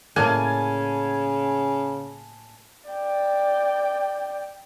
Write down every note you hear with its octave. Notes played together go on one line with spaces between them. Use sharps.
A2 C#3 A#3 G#5 A5
D5 G5